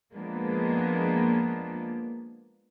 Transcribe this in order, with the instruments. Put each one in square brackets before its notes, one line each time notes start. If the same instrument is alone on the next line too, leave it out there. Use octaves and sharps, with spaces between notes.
[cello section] F3 G#3 A#3 B3 D4